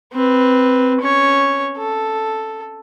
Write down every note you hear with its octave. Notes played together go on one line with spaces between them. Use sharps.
C4 B4
C#4 C#5
A4